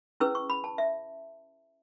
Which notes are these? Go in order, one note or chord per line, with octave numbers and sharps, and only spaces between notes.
C#4 E4 G#4 B4 E6
C#6
B5
A5
E5